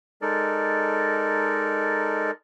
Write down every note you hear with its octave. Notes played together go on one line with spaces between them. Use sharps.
G#3 D#4 A4 A#4 D5